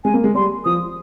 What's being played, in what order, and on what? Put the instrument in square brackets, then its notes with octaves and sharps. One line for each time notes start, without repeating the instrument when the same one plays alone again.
[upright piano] G#3 [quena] G#5
[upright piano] A#3
G#3
[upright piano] G3 [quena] C6
[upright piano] F3 [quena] D#6